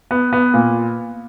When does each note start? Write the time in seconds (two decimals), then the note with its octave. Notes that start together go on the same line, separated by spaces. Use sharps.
0.11 B3
0.33 B3
0.54 A#2